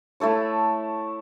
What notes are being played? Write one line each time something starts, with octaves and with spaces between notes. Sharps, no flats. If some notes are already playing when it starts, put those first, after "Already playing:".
A3 E4 A4 C#5